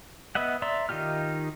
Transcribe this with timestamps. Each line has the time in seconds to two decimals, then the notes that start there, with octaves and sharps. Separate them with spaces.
0.35 B3 B4 D#5 E5 F#5
0.62 D5 E5 A#5 C6 E6
0.89 D#3 D#4 F4 G4 F6